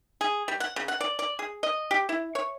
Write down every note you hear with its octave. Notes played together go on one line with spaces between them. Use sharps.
G#4
G3
F#5
C#3
F#5
D5
D5
G#4
D#5
G4
E4
C#5